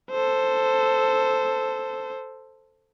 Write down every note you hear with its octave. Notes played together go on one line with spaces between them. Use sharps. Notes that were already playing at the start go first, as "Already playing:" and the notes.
A4 C5